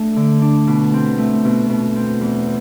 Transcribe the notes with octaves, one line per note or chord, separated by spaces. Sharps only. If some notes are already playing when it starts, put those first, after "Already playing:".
Already playing: A3 D4
D3
D4
B2
C4
A3
B2
B2
C4
E2